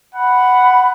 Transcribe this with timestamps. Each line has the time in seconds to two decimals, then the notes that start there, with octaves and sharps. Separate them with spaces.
0.15 F#5 B5